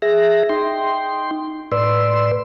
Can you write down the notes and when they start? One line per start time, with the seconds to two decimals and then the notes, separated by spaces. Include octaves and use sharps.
0.02 G#4 E5 A#6
0.49 D#4 G5 C6
1.72 A2 B4 D5 C6 E6